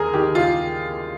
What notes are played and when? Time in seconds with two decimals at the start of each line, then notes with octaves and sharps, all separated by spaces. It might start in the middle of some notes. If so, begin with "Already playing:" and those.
Already playing: D#2 G#4 A#4
0.14 D#3 G4
0.35 F4